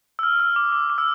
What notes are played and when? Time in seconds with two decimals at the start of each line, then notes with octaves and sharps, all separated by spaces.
0.19 E6
0.23 F6
0.39 E6
0.56 D6
0.72 D6
0.90 D6
0.98 E6